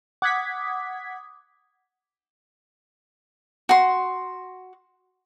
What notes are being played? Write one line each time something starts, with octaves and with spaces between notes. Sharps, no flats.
F#5 D6 D#6 G#6 B6
F#4 C6